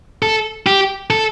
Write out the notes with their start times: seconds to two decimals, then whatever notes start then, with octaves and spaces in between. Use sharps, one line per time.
0.22 A4
0.66 G4
1.10 A4